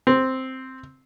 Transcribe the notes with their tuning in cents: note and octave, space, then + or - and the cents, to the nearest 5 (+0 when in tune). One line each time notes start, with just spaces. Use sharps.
C4 +0